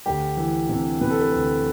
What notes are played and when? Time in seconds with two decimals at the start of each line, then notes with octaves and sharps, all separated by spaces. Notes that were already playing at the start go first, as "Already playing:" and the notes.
0.06 D2 G4
0.37 E3
0.69 C3
1.01 C3 B4
1.10 A4
1.21 B4
1.32 D2